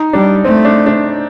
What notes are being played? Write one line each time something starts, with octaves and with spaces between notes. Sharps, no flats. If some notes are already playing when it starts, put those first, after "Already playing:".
Already playing: D#4
G3 D4
A3 C4
D4
D4